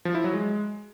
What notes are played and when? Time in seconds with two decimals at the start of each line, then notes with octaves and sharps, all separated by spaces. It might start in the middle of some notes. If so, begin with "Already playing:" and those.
0.05 F3
0.15 E4
0.24 F#3
0.34 G#3